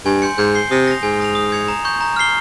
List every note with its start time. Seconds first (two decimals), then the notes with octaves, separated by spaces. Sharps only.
0.05 G2 G#5
0.22 C6 G6 C#7
0.38 G#2 G6
0.55 C7 G7
0.71 C3 D#6
0.88 A#6 F7
1.03 G#2 G#5
1.20 D#6 A#6 F7
1.35 D#6
1.52 G#6 C#7 F7
1.68 A#5
1.85 C#6 G6
2.01 A#5
2.16 F6 C7 G7